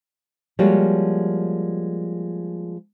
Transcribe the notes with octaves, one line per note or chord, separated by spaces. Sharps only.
F3 G3 G#3 A#3 F#4 C#5